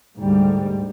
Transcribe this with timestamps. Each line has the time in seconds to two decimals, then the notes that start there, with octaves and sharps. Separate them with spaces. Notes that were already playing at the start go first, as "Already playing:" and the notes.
0.19 D2 G#2 G3